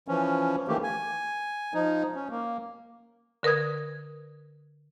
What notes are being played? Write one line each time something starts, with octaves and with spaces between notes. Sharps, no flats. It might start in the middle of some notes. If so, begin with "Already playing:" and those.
E3 F3 C#4
D#3 E3 A3 A#3 G4
G#5
F3 D#4
C#4
A#3
D3 A#4 B4 D#6 G#6